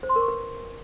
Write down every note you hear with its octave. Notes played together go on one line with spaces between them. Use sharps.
C5
C6
A#4
C#6
B4